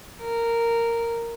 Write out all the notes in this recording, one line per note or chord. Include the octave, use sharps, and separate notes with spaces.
A#4